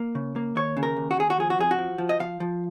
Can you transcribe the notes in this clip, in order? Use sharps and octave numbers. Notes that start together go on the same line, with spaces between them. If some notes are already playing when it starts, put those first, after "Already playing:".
Already playing: A#3
C#3
A#3
D#2 C#5
C#3
A#4
D#2
F#4
D#2 G#4
F#4
F3 G#4
F#4
F2 G#4
F#4
F3
F3
D#5
F3 F5
F3